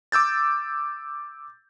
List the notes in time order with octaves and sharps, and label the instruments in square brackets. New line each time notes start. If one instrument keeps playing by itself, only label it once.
[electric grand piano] D6 E6 G6 A6